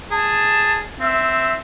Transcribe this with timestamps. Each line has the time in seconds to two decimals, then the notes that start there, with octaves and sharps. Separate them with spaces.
0.11 G#4 A5
1.00 C4 E5